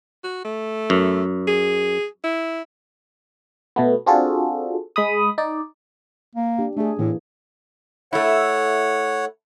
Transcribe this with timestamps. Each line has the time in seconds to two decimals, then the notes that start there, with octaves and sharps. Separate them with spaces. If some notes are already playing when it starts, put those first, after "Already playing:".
0.24 F#4
0.44 A3
0.90 F#2
1.47 G#4
2.24 E4
3.76 B2 A3 B3
4.06 C4 D4 F4 F#4 G#4 A4
4.96 G#3 B5 D#6
5.38 D#4 D5
6.35 A#3
6.59 D4 G4
6.77 A3 D4 G#4
6.99 A2 E3 A#3
8.13 A3 E4 C#5 F#5